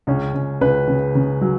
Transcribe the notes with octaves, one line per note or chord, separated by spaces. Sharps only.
C#2 C#4
C#2
C#2 B4
C#3
C#3
F#3